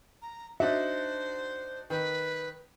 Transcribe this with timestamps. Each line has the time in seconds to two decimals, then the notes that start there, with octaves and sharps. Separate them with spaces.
0.22 A#5
0.60 D4 D#4 F#4 C5 E5
1.90 D#3 B4